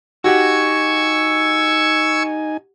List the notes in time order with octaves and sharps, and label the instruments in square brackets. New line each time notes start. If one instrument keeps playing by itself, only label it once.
[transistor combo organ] D#4 G#5 [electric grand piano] F#4 G4 F#5 [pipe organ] C#6 E6 G#6